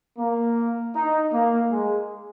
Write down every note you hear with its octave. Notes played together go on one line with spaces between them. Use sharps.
A#3
D#4
A#3
G#3